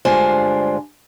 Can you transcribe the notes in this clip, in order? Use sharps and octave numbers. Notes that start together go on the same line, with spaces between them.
D2 G2 G#3 D4 F4 C5